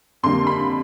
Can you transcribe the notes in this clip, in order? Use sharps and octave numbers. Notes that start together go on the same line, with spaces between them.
F2 D3 G3 A#3 C6
B5